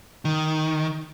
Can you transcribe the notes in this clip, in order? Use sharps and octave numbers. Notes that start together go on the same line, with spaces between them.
D#3